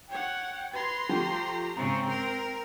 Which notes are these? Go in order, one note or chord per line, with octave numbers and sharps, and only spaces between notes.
C#5 F#5 G5
B4 A#5 C6 G#6
F3 A3 G4 G5
G#2 C#3 C4 G5 A#5
A#4